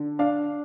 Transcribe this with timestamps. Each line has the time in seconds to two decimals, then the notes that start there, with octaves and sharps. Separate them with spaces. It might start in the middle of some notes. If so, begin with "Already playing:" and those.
Already playing: D3
0.19 D4 F5